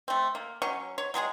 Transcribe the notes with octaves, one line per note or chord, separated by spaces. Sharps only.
A3 C4
A#3
F#3 C#4 C#6
C#5
F#3 G#3 F#4 G#4